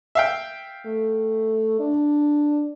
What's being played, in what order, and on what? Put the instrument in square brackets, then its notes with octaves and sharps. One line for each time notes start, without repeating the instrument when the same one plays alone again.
[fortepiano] E5 F5 G5
[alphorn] A3
D4